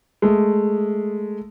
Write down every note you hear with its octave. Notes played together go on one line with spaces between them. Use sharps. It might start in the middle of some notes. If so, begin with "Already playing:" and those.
G#3 A3